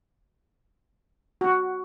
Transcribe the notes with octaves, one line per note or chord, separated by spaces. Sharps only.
F#4